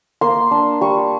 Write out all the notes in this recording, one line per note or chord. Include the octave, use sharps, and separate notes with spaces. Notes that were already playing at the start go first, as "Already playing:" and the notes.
A#3 C6
D4
G3 C#6